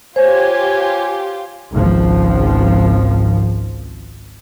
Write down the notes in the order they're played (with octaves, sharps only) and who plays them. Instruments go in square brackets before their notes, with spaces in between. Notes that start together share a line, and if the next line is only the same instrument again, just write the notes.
[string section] F4 G4 [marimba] C5 [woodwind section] C#5 G#5
[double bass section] G#1 C#2 F3